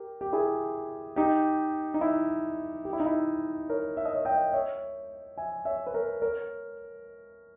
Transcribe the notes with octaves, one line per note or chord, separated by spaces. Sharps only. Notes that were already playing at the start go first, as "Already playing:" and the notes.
Already playing: G4 A#4
G4
E4 G#4
D#4 G4
D#4
E4
G4
E4
D#4
E4
A#4 C#5
E5
D#5
C#5 E5
D#5 G5
C#5 E5
E5 G#5
C#5 E5
B4
A#4 C#5
A#4 C#5